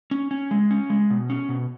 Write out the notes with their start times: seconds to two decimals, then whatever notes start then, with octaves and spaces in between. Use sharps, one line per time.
0.11 C#4
0.31 C#4
0.51 G#3
0.71 C#4
0.90 G#3
1.10 B2
1.30 C#4
1.49 B2